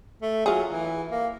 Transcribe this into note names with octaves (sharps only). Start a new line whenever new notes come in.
A3
F#3 F4 G#4
E3
A#3